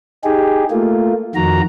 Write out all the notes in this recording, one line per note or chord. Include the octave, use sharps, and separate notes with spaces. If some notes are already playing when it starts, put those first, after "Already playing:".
D#4 G4 G#4
A3 A#3 F4
F2 D#3 F#4 A#5